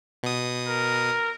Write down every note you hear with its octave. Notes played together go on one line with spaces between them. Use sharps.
B2 D#6
A#4